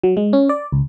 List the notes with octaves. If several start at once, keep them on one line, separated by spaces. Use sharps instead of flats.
F#3
G#3
C#4
D5
C#2